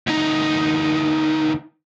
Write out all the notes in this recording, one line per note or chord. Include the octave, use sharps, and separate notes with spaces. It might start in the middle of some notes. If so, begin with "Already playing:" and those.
D2 D#4